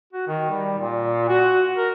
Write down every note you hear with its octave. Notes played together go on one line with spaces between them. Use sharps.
F#4
D#3
G3
A#2
F#4
A#4